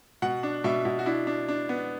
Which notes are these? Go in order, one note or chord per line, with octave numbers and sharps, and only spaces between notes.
B2 F#5
D4
B2 E5
B2
F#4
D4 E4
D4
D4
B3